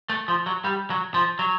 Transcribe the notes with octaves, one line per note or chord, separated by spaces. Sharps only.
A3
F3
F#3
G3
F#3
F3
F#3